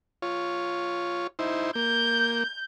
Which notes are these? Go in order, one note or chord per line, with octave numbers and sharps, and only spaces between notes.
F4 C#5
D#4 E4 C5
A#3 G6